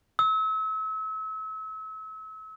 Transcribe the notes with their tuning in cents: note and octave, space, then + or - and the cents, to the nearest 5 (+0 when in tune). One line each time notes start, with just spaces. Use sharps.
E6 -35